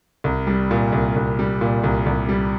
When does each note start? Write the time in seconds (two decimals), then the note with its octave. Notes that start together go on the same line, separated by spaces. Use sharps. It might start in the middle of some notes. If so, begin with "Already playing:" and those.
0.24 C2
0.47 G3
0.71 A#2
0.92 C2
1.16 C2
1.39 G3
1.61 A#2
1.84 C2
2.06 C2
2.29 G3